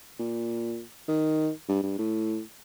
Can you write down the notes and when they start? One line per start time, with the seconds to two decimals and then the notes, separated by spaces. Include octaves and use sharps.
0.19 A#2
1.08 D#3
1.69 G2
1.83 G2
1.98 A2